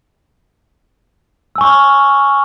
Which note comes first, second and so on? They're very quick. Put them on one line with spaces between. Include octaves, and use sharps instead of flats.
E6 G#5 C#6 F6